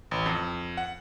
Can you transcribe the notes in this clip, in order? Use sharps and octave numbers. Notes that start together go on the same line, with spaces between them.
A1
F2
F#5